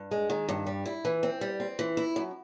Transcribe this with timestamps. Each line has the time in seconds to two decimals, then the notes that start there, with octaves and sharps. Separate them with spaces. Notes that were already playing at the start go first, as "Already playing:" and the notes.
Already playing: G2
0.11 G#3
0.30 D#3
0.49 G2
0.67 G3
0.86 E4
1.05 E3
1.23 C4
1.41 G3
1.60 C4
1.79 E3
1.97 E4
2.16 F#2